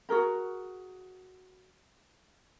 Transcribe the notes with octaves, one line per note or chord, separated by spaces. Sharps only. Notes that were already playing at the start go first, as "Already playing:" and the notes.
F#4 G#4 A#4 A#5